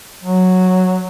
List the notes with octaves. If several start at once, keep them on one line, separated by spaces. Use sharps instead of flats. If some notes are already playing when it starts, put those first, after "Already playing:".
F#3